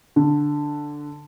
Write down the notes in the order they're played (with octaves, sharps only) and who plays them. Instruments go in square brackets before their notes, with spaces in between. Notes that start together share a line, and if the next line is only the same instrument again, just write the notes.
[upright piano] D3